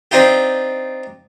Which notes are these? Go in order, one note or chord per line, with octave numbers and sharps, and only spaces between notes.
C4 D4 D#4 F4 G4